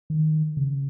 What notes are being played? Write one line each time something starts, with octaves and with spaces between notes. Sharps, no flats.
D#3
C#3